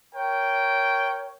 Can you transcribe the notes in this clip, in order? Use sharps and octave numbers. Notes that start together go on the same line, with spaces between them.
A#4 C#5 G5